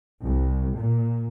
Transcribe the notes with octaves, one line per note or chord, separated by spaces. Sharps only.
C2
A#2